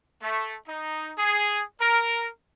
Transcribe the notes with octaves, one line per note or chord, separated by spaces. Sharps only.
A3
D#4
G#4
A#4